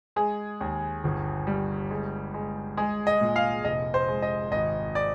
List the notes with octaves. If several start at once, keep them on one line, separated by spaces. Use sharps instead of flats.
G#3 G#4
D#2
G1
G3
G#3
G#3
G#3 G#4
D#5
A#2
F5
F1 D#5
C5
G#3
D#5
G#1 D#5
D5